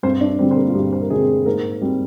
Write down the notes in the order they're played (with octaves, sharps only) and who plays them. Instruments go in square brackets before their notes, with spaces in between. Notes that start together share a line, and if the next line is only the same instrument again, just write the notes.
[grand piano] G2 C4 C5
D4 D5
D3 G3 C4 C5
C5
A#3 A#4
F4
G2 G4
C5
A#4
D3 G3 G#3 C4 G#4
G#2 A#3 A#4
G3 C4